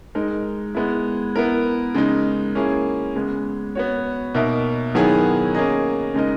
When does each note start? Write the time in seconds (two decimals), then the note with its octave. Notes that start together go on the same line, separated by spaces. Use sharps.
0.15 G#3 D#4 A#4
0.75 G#3 B3 E4
1.36 B3 E4 A#4
1.94 C#3 G#3 D#4
2.55 A#3 C#4 E4 G#4
3.15 C#3 G#3 B3
3.75 B3 F#4 C#5
4.35 B2 A#3 D#4 A#4 E5
4.95 D#3 F#3 B3 E4 G#4
5.55 A#3 C#4 G#4 D#5
6.14 C#3 G#3 D#4 A#4 D#5